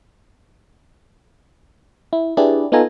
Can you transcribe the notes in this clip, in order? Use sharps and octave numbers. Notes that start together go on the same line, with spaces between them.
E4
D4 E4 G4 G#4 B4 D5
B3 D#4 F4 A4 G#5 A#5